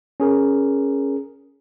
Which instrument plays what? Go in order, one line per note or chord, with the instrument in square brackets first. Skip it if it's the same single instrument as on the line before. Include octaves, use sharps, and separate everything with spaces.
[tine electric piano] C#4 G#4 A#4